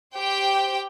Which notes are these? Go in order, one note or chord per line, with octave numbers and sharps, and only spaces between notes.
G4 C5 G5